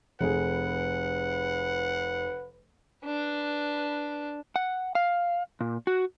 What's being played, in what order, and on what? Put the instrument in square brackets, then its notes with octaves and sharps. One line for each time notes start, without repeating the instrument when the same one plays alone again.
[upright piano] F1 G#4 [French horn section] B4 [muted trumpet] F#5
[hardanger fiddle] D4 B4
[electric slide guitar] F#5
F5
A#2
F#4